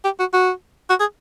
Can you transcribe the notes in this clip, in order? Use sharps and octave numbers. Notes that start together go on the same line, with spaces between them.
G4
F#4
F#4
F#4
G#4